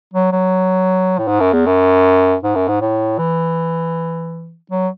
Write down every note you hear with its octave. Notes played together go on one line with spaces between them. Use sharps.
F#3
F#3
A2
G#2
F#2
E2
F#2
G#2
F#2
G#2
A2
E3
F#3